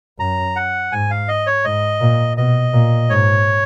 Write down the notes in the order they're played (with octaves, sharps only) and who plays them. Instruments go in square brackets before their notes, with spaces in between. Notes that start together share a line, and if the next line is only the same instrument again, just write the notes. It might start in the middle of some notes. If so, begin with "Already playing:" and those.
[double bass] F#2 [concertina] A#5
[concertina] F#5
[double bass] G#2 [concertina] G#5
[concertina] F5
D#5
C#5
[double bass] G#2 [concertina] D#5
[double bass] A#2
[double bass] B2 [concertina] D#5
[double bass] A#2
[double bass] G#2 [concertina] C#5